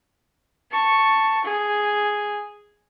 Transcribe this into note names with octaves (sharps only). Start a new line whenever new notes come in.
A5 C#6
G#4